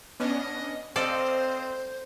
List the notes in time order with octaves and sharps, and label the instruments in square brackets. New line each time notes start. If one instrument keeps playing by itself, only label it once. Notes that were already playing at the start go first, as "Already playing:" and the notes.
[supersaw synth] B3 C#4 D4 [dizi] D#5
[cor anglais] C4 [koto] A4 D5 [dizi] C5 [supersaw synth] D#5 F5